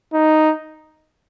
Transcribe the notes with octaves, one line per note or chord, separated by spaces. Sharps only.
D#4